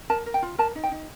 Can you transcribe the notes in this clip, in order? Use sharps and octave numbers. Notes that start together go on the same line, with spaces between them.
A#4 A5
A#4
G5
F4
A#4 A5
D#4
G5
D#4